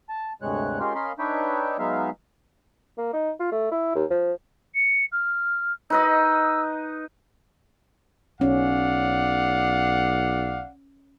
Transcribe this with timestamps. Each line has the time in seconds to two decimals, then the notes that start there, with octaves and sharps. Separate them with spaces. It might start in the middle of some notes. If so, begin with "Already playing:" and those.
0.09 A5
0.42 D2 G2 C3 G#3 C#5 F#6
0.80 G#3 C#4 F4 G4 A#4 C6
0.95 C#4 A#4 D#5 F5 B5 C6
1.19 D4 D#4 B4 C#5 E5 G5
1.79 F#3 G#3 B3 D#4 E5 F5
2.98 A#3
3.13 D#4
3.40 F4
3.52 A3
3.72 E4
3.95 D#2
4.10 F3
4.74 C#7
5.12 F6
5.90 D#4 B4 D#5 E6
8.41 B1 C#4 D5 F5 F#5